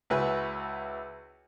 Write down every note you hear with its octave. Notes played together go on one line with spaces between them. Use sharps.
C#2 E4 F#4 B4 G#5 E6